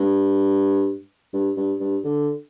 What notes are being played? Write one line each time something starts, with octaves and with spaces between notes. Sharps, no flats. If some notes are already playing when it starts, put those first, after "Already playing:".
Already playing: G2
G2
G2
G2
D3